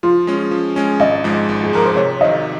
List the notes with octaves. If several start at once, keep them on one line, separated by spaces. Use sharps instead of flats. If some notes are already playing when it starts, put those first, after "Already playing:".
F3 F4
G#3 C#4
F3
G#3 C#4
G#1 D#5
G#2 F3 G#3
G#1
G#4
G#2 F3 G#3 A#4
C5
C3 C#5
D#3 F#3 D#5